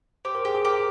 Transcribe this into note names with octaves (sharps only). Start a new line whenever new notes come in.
G4 C5
A#4
G4 G#4
G#4
G4 A#4